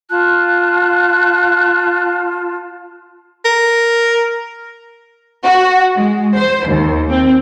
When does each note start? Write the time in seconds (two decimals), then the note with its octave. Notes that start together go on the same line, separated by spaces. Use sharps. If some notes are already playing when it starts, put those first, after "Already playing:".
0.10 F4 A5 F#6
3.45 A#4
5.43 F#4
5.97 G#3
6.35 C5
6.67 D#2
7.10 C4